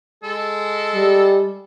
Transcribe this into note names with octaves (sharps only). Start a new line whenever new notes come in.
G#3 A4
G3